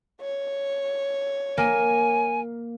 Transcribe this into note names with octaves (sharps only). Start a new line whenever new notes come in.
C#5
A#3 G#5